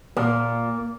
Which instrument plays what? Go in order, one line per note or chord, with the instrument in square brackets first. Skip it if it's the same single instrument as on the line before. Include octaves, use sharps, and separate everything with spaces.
[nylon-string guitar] A#2 [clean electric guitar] A#3